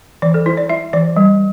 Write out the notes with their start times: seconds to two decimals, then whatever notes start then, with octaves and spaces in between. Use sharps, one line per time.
0.22 E3 D5
0.34 A4
0.46 E4 C5
0.57 D5
0.69 E4 E5
0.93 E3 D5
1.17 G3